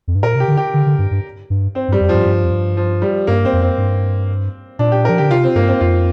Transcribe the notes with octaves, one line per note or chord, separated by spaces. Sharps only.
F2
G2
A#2 A#4
C3
G4
D3
G4
D3
D3
G2
G2
G2
C4
G2
G3
F2
G2 F3
G2
F2
G2
F3
G3
G2 A#3
C4
F2
C4
G2
A#2 D4
G4
F3 A#4
D3 G4
C3 F4
C4
G2 A#3
C4
F2 F4